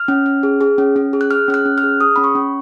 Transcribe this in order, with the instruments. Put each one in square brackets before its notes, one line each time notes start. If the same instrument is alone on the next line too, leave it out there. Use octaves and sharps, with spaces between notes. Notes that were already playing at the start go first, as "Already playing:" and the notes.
Already playing: [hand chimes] F6
C#4
C#4
G#4
G#4
C#4
C#4
G#4
F#6
G#4 F6
C#4 F6
F#6
C#4
F6
G#4
G#4 D#6
C#4 B5
C#6
C#4